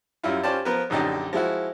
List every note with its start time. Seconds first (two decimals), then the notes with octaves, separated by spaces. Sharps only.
0.24 F#2 G3 E4 F4
0.43 C#4 F4 G4 C5 D5 A5
0.65 F3 B3 A#4 B4
0.90 A#1 F#2 D3 D#4 G4 D5
1.33 F3 G#3 E4 F#4